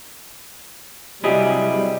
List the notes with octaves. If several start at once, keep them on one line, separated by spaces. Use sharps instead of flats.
C3 F#3 G3 E4 G4 G#4 D#5